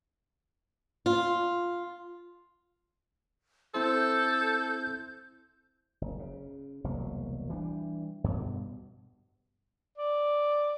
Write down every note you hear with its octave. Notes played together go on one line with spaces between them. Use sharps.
F4
C4 E4 A4 C5 G6
F#1
C#3
E1 C2 F#3 A#3
E3 G3 A#3 D4
G2 B2
D5